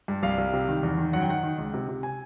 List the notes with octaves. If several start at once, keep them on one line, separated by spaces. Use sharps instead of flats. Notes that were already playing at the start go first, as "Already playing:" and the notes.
G2
C2 F5
C2
C3
D#3
E2
D#3
F#2 F#5
G5
D#3 F#5
D#3
C#2
C3
C3
G#5